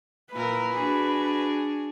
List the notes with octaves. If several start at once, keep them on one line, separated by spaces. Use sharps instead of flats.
A#2 E4 A#4 B4
D4 F#4 G#4